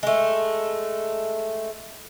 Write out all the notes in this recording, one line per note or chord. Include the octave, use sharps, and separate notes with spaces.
G#3 A3